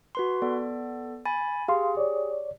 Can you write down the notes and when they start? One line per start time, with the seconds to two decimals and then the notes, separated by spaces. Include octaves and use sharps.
0.15 F#4 B4 C6
0.42 B3 A4 D5
1.25 G#5 B5 A6
1.68 G4 G#4 F5 C6
1.97 C#5 D5